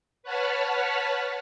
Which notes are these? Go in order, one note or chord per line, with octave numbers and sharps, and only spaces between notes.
B4 C#5 F#5 A5 B5 F6